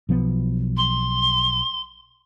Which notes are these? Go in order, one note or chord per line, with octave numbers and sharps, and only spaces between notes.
B1 F3 B3
C6